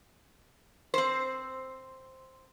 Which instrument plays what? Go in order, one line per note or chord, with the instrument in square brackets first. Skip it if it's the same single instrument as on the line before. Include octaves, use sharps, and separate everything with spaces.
[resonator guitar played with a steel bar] C4 C5